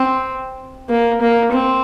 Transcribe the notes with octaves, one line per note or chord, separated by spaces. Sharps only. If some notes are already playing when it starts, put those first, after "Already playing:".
Already playing: C4
A#3
A#3
C4